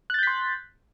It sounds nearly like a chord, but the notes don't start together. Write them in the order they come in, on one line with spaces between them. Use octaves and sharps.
F#6 A6 G6 B6 C6